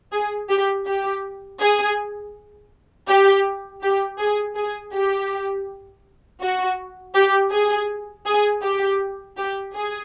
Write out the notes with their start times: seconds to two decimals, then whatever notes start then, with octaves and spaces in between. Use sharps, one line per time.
0.12 G#4
0.49 G4
0.86 G4
1.60 G#4
3.08 G4
3.82 G4
4.19 G#4
4.56 G#4
4.93 G4
6.42 F#4
7.15 G4
7.52 G#4
8.27 G#4
8.63 G4
9.37 G4
9.74 G#4